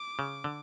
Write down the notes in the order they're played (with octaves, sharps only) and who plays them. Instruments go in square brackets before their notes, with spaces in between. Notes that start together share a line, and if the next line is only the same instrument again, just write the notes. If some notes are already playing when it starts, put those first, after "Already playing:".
Already playing: [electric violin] D6
[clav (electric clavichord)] C#3
D3